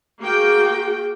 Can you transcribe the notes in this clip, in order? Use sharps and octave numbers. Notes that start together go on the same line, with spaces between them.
A#3 F#4 G#4 G5